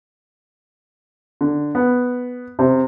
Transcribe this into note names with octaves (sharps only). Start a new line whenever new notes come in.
D3
B3
C3